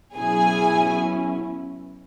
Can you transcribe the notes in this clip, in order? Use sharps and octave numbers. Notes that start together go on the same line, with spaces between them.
B2 F#3 C#4 E4 G#4 G#5